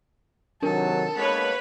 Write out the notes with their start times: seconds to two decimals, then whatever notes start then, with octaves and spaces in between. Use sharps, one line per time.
0.62 C3 D#3 F#3 D4 A4 A#4
1.15 G#3 A#3 B3 B4 C#5 B5